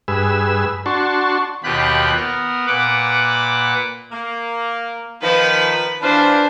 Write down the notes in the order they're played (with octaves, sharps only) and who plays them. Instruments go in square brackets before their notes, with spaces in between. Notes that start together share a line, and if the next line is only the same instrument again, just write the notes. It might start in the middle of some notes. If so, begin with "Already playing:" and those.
[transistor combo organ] G2 G#4 B4 E6
D4 F#4 A5 C6 C#6
[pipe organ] D#2 B2 F4 G4 B5 F#6
B3 A#4
A#2 B4 F#5 D6
[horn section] A#3
[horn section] D#3 F3 [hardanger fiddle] B4
[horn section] E3 F4 B4 [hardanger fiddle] D4 C5